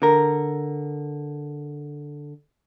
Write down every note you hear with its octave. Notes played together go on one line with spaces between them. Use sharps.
D3 A#4